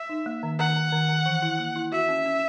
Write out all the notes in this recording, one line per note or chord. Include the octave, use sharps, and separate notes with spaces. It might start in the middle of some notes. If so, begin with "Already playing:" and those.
Already playing: E5
D#4
A#3
D#3
D#3 F#5
D#3
D#3
D#3
E3
E4
A#3
E4
F#4 E5
C#4
C#4